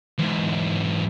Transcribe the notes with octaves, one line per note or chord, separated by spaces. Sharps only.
E2 G#2